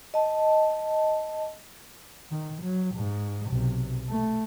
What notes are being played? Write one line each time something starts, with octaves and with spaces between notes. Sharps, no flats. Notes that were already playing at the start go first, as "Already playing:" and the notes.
D#5 A5
D#3
F#3
G#2
B1 C3
A3